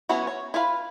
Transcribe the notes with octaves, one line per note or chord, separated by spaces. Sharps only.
F#3 B3 C#4 E4 F#4
C#5
E4 F4 B4 F5 B5